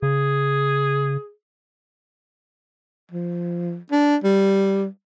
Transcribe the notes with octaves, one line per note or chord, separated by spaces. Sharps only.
C#3 G#4
F3
D4
G3